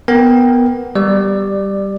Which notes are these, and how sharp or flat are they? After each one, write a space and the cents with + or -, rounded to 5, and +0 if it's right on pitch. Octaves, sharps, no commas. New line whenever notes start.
B3 +0 A#4 -5 G5 +10
G3 +0 D5 +15